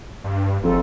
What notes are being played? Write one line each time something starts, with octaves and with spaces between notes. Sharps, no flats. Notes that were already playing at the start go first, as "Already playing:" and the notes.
G2
F#1 F2 A4